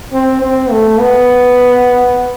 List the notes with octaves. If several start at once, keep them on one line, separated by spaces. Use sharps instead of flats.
C4
C4
A3
B3